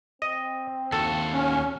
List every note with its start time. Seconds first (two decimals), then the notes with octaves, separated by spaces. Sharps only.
0.22 C4 D#5
0.92 D#2 F#4 A4
1.33 C#4